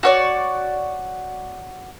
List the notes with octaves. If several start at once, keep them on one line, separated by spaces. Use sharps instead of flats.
F#4 C#5 D5